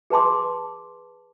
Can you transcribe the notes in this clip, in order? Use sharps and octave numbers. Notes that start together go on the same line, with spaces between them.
G#4 B4 A5 C6 D6